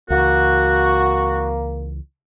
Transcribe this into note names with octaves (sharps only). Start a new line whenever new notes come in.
C#2 E3 A#3 F#4